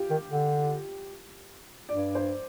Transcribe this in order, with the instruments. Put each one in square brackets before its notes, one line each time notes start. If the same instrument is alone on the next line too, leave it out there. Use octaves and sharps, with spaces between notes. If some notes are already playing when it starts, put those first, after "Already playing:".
Already playing: [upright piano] F4 G4
[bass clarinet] D#3
D3
[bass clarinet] G2 [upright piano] D5
[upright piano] C5